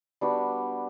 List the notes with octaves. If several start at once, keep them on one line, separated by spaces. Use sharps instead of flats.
G3 B3 D4 F#4